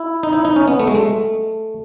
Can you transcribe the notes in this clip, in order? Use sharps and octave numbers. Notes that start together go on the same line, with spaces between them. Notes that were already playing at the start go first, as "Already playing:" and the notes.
Already playing: E4
D#4
E4
D#4
C#4
B3
A3
G#3
A3